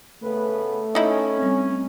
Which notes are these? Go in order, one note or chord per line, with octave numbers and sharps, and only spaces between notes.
C#3 A3 B3 B4
C#4 D#4 E4
G3 C4